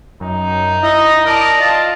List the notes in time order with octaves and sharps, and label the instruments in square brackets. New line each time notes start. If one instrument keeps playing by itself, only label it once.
[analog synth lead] F#2 [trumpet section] D#4
[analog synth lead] E4 [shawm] D#5
[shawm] A#4 [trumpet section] D5 A5 [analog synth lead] D#6
[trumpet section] F4 [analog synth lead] D#5 [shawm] A5